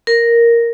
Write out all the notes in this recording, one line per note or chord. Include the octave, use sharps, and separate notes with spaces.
A#4